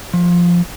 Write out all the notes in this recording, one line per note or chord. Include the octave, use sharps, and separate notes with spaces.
F3